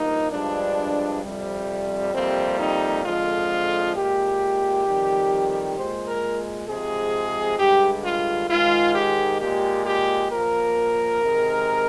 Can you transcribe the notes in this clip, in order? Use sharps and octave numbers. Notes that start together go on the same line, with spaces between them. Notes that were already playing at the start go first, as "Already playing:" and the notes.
Already playing: G2 F3 A#3 D#4
G2 F3 G#3 D4
F2 C3 G3
F2 C3 G3 A#3 C4
D#4
F2 D3 F3 G#3 F4
A#2 G#3 G4
F2 D#3 G3
A#2 G#3 C5
A#4
C3 F3 G#3 G#4
G2 D3 G#3 G4
F4
G#2 D#3 G#3 F4
G4
A#2 G#3 G4
G4
A#2 F3 A#3 A#4
C3 D#3 G#3